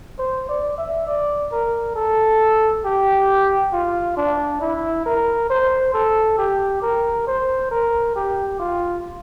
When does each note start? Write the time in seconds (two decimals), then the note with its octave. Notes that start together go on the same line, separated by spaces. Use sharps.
0.19 C5
0.49 D5
0.78 E5
1.07 D5
1.52 A#4
1.95 A4
2.85 G4
3.73 F4
4.17 D4
4.61 E4
5.06 A#4
5.50 C5
5.94 A4
6.38 G4
6.82 A#4
7.27 C5
7.71 A#4
8.15 G4
8.60 F4